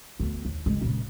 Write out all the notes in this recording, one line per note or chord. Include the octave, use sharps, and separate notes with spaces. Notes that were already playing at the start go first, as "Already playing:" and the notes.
D2 B3
D#2
F#1 G#3
A#2 C#3